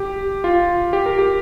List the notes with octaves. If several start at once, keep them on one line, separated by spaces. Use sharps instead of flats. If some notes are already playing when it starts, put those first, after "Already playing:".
Already playing: G4
F4
G4
A#4
G4